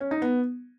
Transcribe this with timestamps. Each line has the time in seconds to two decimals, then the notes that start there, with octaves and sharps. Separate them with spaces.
0.01 C#4
0.11 D#4
0.22 B3